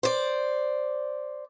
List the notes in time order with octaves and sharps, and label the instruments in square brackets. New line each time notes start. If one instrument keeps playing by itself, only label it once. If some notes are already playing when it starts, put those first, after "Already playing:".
[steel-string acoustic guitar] C5 D5